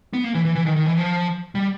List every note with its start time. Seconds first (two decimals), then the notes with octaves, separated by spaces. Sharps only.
0.13 B3
0.24 A#3
0.35 E3
0.45 E3
0.55 E3
0.66 D#3
0.76 D#3
0.86 E3
0.97 F3
1.55 G3